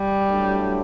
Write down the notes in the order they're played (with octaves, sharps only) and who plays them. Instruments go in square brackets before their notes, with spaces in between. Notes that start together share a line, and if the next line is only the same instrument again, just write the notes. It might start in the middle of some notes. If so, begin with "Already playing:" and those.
Already playing: [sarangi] G3
[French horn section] A2 F#3 A3 D4